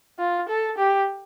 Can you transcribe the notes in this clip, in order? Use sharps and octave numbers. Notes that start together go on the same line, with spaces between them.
F4
A4
G4